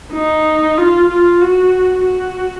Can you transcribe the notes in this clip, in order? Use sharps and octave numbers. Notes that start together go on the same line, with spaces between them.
D#4
F4
F4
F#4
F#4